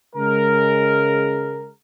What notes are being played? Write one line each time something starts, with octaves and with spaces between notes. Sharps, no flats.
C#3 G#3 A#4